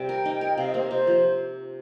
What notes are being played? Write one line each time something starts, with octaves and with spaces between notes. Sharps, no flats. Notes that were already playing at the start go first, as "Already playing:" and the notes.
Already playing: C3 G3 C4 G5
A#4
D#4
A#4
C3 F5
D#5
A#3 C5
D#5
C3 C5
F3